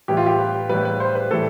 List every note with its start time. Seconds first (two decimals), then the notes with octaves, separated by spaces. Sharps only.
0.08 A2 E3 G3 G4
0.17 F4
0.26 G4
0.39 B4
0.69 A2 E3 G3 B4
0.85 B4
1.00 C5
1.15 B4
1.31 A2 E3 G3 A4